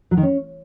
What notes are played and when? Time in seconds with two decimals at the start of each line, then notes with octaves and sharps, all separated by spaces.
0.11 F#3
0.17 D#3
0.23 C#4